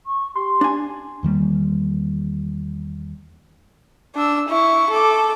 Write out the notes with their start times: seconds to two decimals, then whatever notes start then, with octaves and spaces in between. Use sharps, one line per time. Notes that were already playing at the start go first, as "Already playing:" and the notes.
0.06 C#6
0.36 G4 C6
0.61 D4 G#5
1.23 E2 D#3 G3 A#3
4.15 D4 E6
4.48 E4 C#6
4.90 A4 D6